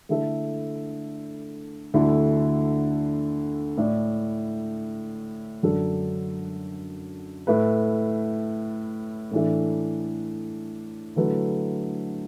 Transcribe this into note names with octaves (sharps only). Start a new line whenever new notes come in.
D3 A3 E4 A4 E5
D2 D3 A3 E4
A2 A3 E4 D5
F#2 D3 F#3 D4 A4
A2 A3 E4 B4
A2 E3 D4 A4 E5
D3 F#3 A3 E4 B4